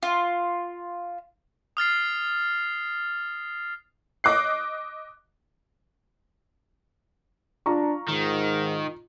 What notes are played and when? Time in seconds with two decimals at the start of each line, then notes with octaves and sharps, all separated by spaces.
0.03 F4
1.77 D#6 F6 A6 C7
4.24 D#5 D6 F#6 C7
7.66 D4 F4 A#5 C#6
8.09 G#2 D#3